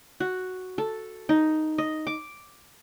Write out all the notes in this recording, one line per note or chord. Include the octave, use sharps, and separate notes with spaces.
F#4
A4
D#4
D#5
D6